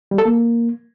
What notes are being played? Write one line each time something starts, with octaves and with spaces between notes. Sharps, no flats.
G3
A4
A#3